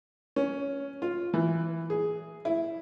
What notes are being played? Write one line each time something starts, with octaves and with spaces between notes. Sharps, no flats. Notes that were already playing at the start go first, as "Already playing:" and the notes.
C#4
F4
E3
G#4
E4